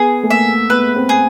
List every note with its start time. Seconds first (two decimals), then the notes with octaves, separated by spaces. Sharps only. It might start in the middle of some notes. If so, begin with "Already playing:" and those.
Already playing: B3 G#4
0.23 A3
0.30 A#3 E5
0.70 B3 B4
0.96 C4
1.09 G#4